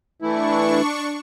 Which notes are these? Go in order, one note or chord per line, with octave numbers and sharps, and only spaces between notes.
E3 A3 D4 E4 C#6